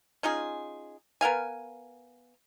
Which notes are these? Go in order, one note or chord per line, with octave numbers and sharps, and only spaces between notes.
C#4 D#4 F4 G#4
B3 A#4 F5 G#5